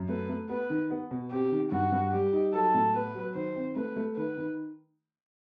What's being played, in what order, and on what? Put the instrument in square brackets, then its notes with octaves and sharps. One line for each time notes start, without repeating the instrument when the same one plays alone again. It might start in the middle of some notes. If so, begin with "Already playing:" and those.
Already playing: [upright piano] F#2
[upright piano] A3 [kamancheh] B4
[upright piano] A3
[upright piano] B3 [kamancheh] B4
[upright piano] D#3
B3
B2
[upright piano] C4 [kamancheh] G4
[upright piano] D#3
[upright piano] G2 [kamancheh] F#4
[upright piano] G2
[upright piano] G3 [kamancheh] G4
[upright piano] D#4
[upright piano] F#3 [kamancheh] A4
[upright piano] A2
[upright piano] B3 [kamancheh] B4
[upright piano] F#3
[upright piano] D#3 [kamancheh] C5
[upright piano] C4
[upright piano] A3 [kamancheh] B4
[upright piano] A3
[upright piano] D#3 [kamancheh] B4
[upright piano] D#3